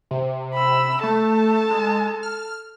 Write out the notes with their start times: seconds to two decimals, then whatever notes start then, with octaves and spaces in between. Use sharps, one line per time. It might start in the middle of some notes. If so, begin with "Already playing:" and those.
0.11 C3
0.54 B5 E6
1.03 A3 A4 A5
1.71 G#3
2.23 F6